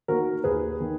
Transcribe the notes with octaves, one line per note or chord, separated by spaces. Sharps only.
D#3 A#3 F#4 A#4
D#2 G#4 B4
D#3 A#3